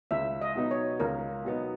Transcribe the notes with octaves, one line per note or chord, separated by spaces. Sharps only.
C#2 E5
D#5
B2 F#3 B3 D#4
C#5
C#2 A#4
B2 F#3 B3 D#4